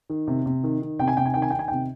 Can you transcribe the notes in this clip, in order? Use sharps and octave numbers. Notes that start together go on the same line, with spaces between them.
D#3
C3
C3
D#3
D#3
C3 G5
G#5
C3 G5
G#5
D#3 G5
G#5
D#3 G5
G#5
C3 G5